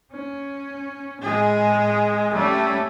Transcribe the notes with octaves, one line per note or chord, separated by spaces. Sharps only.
C#4
A2 G#3 G#4
G3 A3 C#4